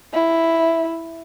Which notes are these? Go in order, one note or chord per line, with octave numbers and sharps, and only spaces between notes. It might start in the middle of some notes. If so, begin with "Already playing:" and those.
E4